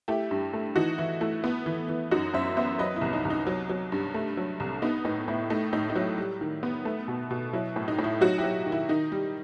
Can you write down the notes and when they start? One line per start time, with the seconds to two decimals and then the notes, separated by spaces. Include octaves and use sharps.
0.08 A3 E4 G4
0.31 G2
0.53 A3
0.76 E3 D#4 F#4
0.98 E3 E4
1.21 A3 E4
1.44 B3
1.66 E3
1.89 E3
2.11 F#2 D#4 F#4
2.34 F#2 C5 E5
2.57 B3 C5 E5
2.79 F#3 B4 D#5
2.96 E4
3.01 C2
3.13 D#4
3.25 C2
3.30 D#4
3.47 F#3
3.69 F#3
3.92 G2
4.14 A3
4.37 F#3
4.60 C2
4.82 B3 D#4
5.05 A2 D#4
5.28 A2 E4
5.50 A3 D#4
5.73 A2 D#4
5.90 D#4
5.96 F#3 E4
6.18 G3
6.41 D#3
6.63 B3
6.85 A3
7.08 B2
7.31 B2
7.53 F#3 E4
7.76 A2
7.88 D#4
7.98 A2
8.04 E4
8.21 F#3 D#4 F#4
8.38 E4 G4
8.44 F#3
8.66 D#3
8.72 E4
8.89 D#3 D#4
9.12 G3